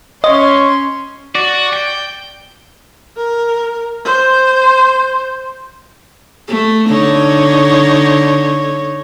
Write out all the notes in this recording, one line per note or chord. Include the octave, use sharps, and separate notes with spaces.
C#4 C#5 D#5 C6
F#4 D5
G5
A#4
C5
A3
D3 D#4 C#5